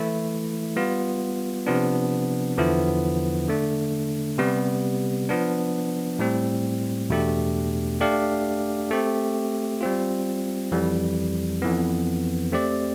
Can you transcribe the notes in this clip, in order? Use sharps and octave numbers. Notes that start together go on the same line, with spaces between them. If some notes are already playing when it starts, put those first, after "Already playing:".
Already playing: E3 A3 E4
G3 B3 F4
C3 F3 B3 D4
E2 D3 F3 B3 E4
D3 A3 D4
C3 G3 B3
F3 B3 D4
A2 G3 C4
E2 B2 A3 D4 G4
A3 D4 G4 D5 F5
A3 C4 G4
G3 C4 F4
F2 E3 G3
F2 E3 B3
A3 C4 G4 D5